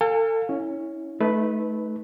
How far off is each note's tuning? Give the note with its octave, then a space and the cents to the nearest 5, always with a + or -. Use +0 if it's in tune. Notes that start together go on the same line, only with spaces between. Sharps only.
A4 +35 F5 +25 G#5 -25
C#4 +5 E4 -25
A3 -20 D#4 +15 B4 +0